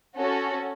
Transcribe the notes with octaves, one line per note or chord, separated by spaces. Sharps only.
C#4 F#4 A4